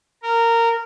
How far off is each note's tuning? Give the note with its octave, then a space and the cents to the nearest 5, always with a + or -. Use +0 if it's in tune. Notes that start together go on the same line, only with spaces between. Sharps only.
A#4 -15